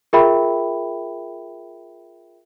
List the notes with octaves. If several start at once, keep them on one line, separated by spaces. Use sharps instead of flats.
F4 G#4 A#4 E5 G5 B5